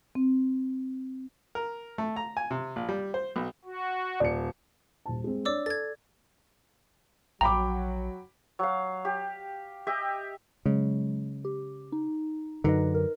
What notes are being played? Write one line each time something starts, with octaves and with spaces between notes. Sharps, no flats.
C4
A#4
A3
A#5
G#5
C3
A#1
G3
C5
B1
F#4
D#1 D5 C#7
D#1 A5
G#3 C4
D4 C#5 D5 D6 E6
A4 G#6 A6
A#1 F#3 G5 A#5 B5 D6
F#3 F5
G4
G4 D#5 E5
C#3 F#3 G#3
G4
D#4
F#2 D3 D#4 B4 D#5
A#4